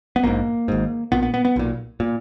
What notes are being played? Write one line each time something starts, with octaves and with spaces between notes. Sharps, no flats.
B3
A#1 G#2 A#3
G#1 G#2
A#1 A#2 B3
B3
B3
B3
B1 A#2
A#2